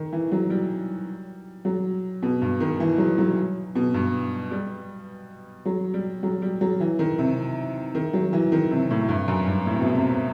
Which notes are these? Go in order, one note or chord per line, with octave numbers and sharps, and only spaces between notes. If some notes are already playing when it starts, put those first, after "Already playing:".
Already playing: D#3
E3
F#3
G3
F#3
B2
G2
D#3
E3
F#3
F#3
B2
G2
G3
F#3
G3
F#3
G3
F#3
E3
D#3
C3
D#3
F#3
E3
D#3
C3
A2
G2
F#2
G2
A2
C3
B2
C3
C3